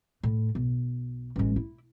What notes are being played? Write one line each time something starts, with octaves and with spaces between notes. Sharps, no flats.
A2
B1
A1 G#3
E4